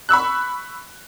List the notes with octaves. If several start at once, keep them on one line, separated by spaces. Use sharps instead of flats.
B5 C#6 E6 F#6